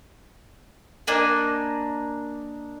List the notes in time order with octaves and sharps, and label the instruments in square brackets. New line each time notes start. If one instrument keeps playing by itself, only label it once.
[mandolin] A#3 D4 D#5 G#5